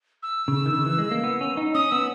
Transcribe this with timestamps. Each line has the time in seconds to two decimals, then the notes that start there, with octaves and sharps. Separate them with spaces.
0.23 E6
0.48 C#3
0.66 D#3
0.73 C#3
0.86 E3
0.98 G#3
1.11 A#3
1.24 B3
1.41 C#4
1.57 D#4
1.74 C#4 D#6
1.91 B3 E6